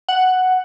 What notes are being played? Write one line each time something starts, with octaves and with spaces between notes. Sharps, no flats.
F#5